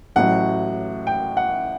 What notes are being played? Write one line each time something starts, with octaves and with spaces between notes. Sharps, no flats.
A1 A2 F#3 F#5
G5
F#5